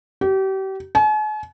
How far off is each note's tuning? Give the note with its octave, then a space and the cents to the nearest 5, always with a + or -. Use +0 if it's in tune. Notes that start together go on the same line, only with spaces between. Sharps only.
G4 -35
G#5 +45